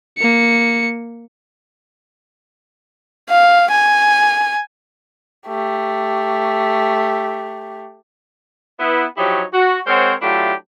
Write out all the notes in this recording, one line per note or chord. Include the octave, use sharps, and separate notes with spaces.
A#3 C#7
F5
G#5
A3 G4
B3 E4
F3 F#3 D#4 E4 G4 C#5
F#4
G#3 C4 A#4 C5 C#5 F#5
F#3 A3 D4 E4 F4 G4